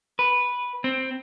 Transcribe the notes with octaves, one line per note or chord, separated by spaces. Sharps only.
B4
C4